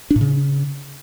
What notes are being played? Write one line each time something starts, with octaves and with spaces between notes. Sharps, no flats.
D4
A2
C#3